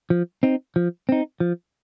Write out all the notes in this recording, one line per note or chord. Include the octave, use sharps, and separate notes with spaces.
F3
C4 D#4
F3
C4 D#4
F3